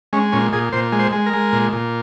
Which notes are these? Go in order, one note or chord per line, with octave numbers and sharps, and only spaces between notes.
G#3 C#4
A#2 C#4
A#2 G#4
A#2 C5
G#3
C5
G#3
A#4
G#3
A#2
A#2